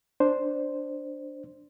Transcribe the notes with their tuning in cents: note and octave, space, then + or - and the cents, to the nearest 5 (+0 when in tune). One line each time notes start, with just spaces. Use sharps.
D4 +0 C5 +0